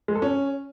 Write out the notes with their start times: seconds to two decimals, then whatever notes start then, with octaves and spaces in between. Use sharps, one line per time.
0.08 G#3
0.15 A4
0.22 C#4